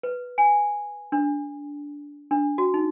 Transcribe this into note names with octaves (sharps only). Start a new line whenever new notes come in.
B4
G#5
D4
D4
F#4
D#4